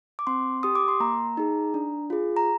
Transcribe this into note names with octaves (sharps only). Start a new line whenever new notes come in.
D6
C4 C6
G4 D#6
D6
C6
A#3 A#5
D#4 G#4
D4
F4 G#4
A#5